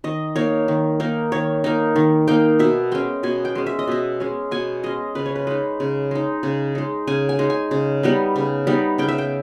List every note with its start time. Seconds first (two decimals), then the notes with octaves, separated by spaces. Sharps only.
0.04 D#3 D#5
0.36 A#3 D#4 C#5
0.68 D#3
1.00 A#3 D#4
1.32 D#3 C#5
1.64 A#3 D#4
1.96 D#3
2.28 A#3 D#4 G5
2.59 B2 E5
2.92 G#3 C#4 G5
3.23 B2 G#5
3.45 G5
3.55 G#3 C#4
3.66 E5
3.79 D#5
3.87 B2 E5
4.20 G#3 C#4
4.51 B2 G#5
4.83 G#3 C#4 D#5
5.15 C#3 B4
5.26 C#5
5.36 B4
5.47 G#3 D#4 B4
5.80 C#3
6.11 G#3 D#4
6.43 C#3
6.75 G#3 D#4
7.07 C#3 G#5
7.29 G#5
7.39 G#3 D#4
7.50 G#5
7.71 C#3
8.03 G3 B3 D#4
8.36 C#3
8.67 G3 B3 D#4
8.98 C#3 G5
9.08 E5
9.18 G5